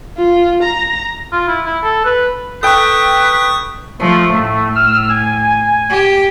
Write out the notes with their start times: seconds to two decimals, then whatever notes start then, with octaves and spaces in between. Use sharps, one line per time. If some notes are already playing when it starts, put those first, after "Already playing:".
0.17 F4
0.63 A#5
1.33 F4
1.48 E4
1.66 E4
1.83 A4
2.05 B4
2.63 A4 B4 G5 C#6 D#6
4.00 F3 A3
4.33 A2
4.76 E6 F6
5.09 G#5
5.90 G4